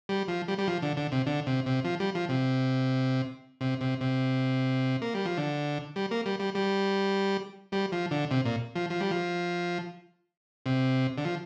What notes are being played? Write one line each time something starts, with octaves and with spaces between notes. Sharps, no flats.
G3
F3
G3
G3
F3
D3
D3
C3
D3
C3
C3
F3
G3
F3
C3
C3
C3
C3
A#3
G3
F3
D3
G3
A#3
G3
G3
G3
G3
F3
D3
C3
A#2
F3
F3
G3
F3
C3
D3
F3